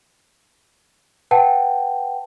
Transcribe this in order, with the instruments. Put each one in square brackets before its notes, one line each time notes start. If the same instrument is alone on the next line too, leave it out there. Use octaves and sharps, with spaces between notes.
[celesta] B4 F#5 G5 A5